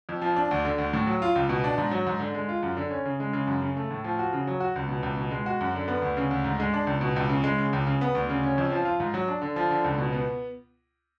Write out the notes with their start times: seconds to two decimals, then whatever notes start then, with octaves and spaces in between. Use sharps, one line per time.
0.09 F2
0.22 F3
0.36 D4
0.51 D2
0.65 D3
0.78 D2
0.93 A2
1.07 F#3
1.22 F4
1.36 C#2
1.49 B2
1.64 D4
1.78 G#2
1.91 F#3
2.06 G#2
2.20 D3
2.35 G#3
2.49 F4
2.63 F#2
2.77 D3
2.91 C#4
3.05 C#3
3.20 G#3
3.33 C#3
3.47 F#2
3.62 C#3
3.77 A3
3.91 A2
4.04 F3
4.19 F#4
4.33 C#3
4.47 F#3
4.60 F#4
4.76 C#2
4.89 B2
5.03 C#2
5.17 B2
5.31 G#3
5.46 F#4
5.61 F#2
5.75 D3
5.88 B3
6.02 D2
6.17 C#3
6.31 D2
6.44 G#2
6.60 G#3
6.74 D4
6.87 C#2
7.01 B2
7.16 C#2
7.29 C#3
7.44 G#3
7.58 C#3
7.73 C#2
7.86 C#3
8.01 B3
8.15 D2
8.30 C#3
8.43 C#4
8.58 F2
8.72 F3
8.85 F4
9.00 G#2
9.14 F#3
9.28 D4
9.42 D3
9.56 F3
9.71 D3
9.84 C#2
9.98 B2
10.12 B3